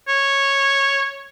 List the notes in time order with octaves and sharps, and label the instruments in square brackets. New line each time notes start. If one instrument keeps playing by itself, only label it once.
[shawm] C#5